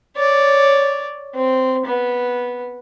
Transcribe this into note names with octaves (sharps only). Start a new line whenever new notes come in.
C#5 D5
C4
B3